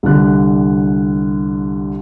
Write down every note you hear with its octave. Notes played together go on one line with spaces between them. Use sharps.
C2 D3 F#6